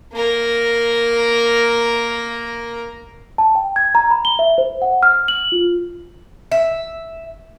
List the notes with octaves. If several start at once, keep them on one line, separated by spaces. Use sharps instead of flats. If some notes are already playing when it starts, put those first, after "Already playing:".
A#3 A#4
A5
G5
G#6
A#5
B5
G7
E5
C5
F#5
F6
F#7
F4
E5